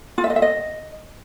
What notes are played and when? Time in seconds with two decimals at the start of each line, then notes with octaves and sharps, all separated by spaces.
0.18 F4
0.24 E5
0.30 D#5
0.36 E5
0.42 D#5